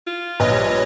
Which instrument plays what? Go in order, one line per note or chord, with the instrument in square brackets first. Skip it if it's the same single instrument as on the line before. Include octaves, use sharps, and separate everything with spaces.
[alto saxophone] F4
[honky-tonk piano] A#1 [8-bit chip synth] B4 C#5 D#5
[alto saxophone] G3